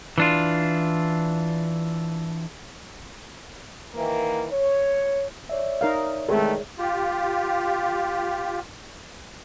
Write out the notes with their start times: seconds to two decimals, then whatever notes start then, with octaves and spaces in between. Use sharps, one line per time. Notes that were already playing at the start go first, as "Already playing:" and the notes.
0.18 E3 D4 F4
3.95 D#3 E3 A#3
4.51 C#5
5.49 C#5 D5 E5
5.81 D#4 A#4 F5
6.29 C2 D#3 G#3 A3
6.78 F4 G4